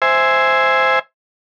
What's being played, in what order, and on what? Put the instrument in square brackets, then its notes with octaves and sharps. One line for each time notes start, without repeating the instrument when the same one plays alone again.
[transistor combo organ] C5 E5 G#5